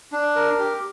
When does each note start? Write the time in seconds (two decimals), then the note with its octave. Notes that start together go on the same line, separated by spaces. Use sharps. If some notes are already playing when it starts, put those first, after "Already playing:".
0.12 D4
0.36 A#4
0.59 G4